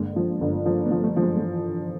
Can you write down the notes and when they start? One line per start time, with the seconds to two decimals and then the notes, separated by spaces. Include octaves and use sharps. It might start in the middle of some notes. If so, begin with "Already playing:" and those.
Already playing: G1 G#3 A#3
0.16 F3
0.41 G1
0.66 F3
0.75 A#3
0.85 A3 B3
0.91 F3
1.04 G3 A3
1.16 F3
1.23 F#3 G#3
1.42 E3